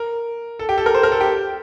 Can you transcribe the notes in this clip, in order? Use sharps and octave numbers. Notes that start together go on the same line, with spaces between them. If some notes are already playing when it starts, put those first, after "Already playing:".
Already playing: A#4
A4
G4
A4
A#4
C5
A#4
A4
G4